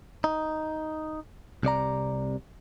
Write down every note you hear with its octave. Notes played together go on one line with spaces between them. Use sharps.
D#4
C2 C3 D5 A#5